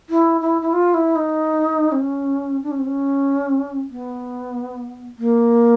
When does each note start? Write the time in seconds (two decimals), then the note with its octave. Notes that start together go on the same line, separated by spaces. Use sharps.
0.10 E4
0.41 E4
0.62 E4
0.73 F4
0.94 E4
1.16 D#4
1.92 C4
2.00 C#4
2.63 D4
2.71 C#4
2.79 C4
2.86 C#4
3.91 B3
5.18 A#3